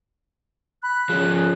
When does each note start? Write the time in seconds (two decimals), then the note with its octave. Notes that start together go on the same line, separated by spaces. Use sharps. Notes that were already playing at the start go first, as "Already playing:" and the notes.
0.83 B5 F#6
1.09 F3 C#4 G#4